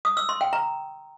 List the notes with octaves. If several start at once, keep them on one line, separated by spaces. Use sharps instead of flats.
D#6
E6
C6
G5
A#5